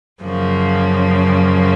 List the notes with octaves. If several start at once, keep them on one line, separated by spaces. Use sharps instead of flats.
F#2 C#3 F3 A#3 C#4